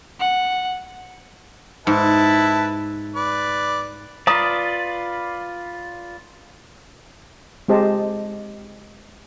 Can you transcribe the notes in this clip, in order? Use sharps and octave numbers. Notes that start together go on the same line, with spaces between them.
F#5
G#2 E4 B4 A5
B4 D5
F4 B4 D5 F5 A#5 D#6
G#3 C4 G4 C5 D#5 A5